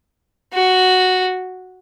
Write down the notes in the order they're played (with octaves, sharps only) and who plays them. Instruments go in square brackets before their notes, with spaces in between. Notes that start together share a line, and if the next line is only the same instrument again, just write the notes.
[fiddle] F#4